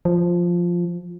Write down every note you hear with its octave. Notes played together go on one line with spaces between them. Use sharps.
F3